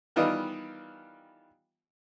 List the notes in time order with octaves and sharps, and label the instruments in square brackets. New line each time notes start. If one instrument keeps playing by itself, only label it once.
[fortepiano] D#3 E3 G3 B3 F4 D#5